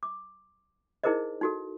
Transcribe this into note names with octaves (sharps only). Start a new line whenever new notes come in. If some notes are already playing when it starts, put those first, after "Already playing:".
D6
D#4 E4 G#4 A#4 C5 D#5
D#4 F#4 A4